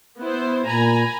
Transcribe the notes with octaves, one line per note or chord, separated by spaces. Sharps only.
B3 E4 C5
A#2 G#5 A#5 B5